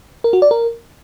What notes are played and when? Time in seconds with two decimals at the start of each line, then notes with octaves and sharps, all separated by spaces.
0.24 A#4
0.33 F#4
0.42 D5
0.51 A#4